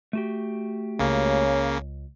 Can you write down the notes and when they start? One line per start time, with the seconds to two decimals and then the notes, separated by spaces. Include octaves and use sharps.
0.13 A3 F#4 G4
0.99 C#2 C#3 A#3 C#4